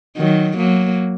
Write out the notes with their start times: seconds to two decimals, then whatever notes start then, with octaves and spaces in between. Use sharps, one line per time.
0.17 D#3 F#3
0.57 F#3 A#3